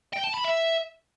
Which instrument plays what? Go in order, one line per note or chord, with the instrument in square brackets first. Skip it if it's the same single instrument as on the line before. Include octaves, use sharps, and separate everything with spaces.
[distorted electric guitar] G5
A5
B5
E5